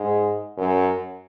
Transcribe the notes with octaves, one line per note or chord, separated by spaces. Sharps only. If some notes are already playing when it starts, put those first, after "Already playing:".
Already playing: G#2
F#2